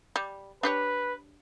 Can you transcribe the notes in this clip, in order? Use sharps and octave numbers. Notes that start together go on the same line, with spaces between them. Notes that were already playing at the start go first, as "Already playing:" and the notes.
G3
D4 G4 B4 C#5